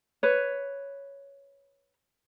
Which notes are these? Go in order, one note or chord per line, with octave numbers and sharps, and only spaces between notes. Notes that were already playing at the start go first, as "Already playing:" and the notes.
B4 C#5